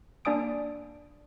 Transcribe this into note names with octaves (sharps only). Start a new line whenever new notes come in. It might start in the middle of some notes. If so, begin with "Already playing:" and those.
A#3 D4 D5 G#5 D#6 D7